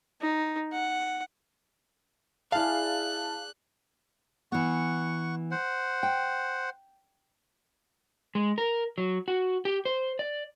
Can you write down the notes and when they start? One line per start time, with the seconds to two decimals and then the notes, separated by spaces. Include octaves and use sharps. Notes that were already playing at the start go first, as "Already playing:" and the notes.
0.21 D#4
0.72 F#5
2.52 E4 G#4 D5 F5 A5 F#6
4.52 E3 B3 F#5 C#6
5.51 C5 F#5
6.03 G5
8.35 G#3
8.58 A#4
8.98 F#3
9.28 F#4
9.65 G4
9.85 C5
10.19 D5